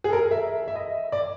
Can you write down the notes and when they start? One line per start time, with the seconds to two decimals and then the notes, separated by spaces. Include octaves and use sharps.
0.04 G#4
0.10 A4
0.13 A#4
0.31 E5
0.68 E5
0.75 D#5
1.12 D5